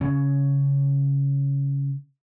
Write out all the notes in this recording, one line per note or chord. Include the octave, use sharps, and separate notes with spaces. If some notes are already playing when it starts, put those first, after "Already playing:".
C#3 C#4